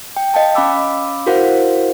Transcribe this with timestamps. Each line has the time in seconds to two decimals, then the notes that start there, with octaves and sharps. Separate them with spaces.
0.16 G5
0.34 D#5 F5 G5 A5
0.55 C#4 F5 B5 D6 E6
1.26 E4 F#4 A#4 C5 F5 F#5